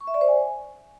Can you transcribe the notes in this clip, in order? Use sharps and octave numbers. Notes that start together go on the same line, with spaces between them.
C#6
E5
D5
C5
G#5